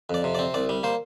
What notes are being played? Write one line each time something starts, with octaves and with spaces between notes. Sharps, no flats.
F2 D5
C3
D5
C4
C2 D5
G3
A#3 C5